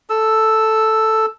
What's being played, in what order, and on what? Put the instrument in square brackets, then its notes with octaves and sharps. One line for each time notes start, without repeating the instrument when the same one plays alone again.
[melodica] A4 E6